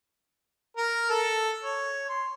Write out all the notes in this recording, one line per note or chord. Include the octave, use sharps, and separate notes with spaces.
A#4
A4
C#5
C6